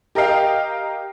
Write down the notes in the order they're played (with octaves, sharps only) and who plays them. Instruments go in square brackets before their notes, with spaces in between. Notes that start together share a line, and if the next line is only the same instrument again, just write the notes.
[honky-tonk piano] G4 A#4 D#5 F5 G5